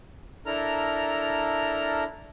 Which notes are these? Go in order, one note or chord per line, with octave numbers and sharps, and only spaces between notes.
D4 E4 A4 A#4 A#5 F6